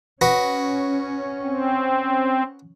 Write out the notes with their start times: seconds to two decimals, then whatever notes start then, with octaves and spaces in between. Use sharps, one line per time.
0.21 C#4 F#4 B4 D#5
1.43 C4